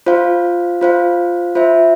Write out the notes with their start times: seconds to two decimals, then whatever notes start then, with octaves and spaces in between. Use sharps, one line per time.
0.06 F4 C5 F5
0.81 F4 C5 F5
1.55 F4 C5 E5